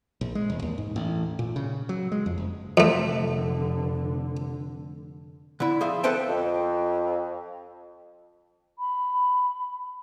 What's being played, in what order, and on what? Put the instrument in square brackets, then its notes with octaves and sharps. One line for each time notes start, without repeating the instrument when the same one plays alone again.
[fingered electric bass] A#1
G#3
E1
D#2
G#2
A1
A#2
C#3
F#3
G#3
F2
F#1
[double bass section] F1 D3 [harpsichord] F2 A3
[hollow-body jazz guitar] D3 E4
F3 G#4 E5
A4 B4 C5 E5 G5 A5
[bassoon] F2
[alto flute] B5